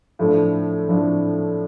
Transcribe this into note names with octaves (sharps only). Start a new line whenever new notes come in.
A2 F3 A3 D4
A2 F3 A3 D4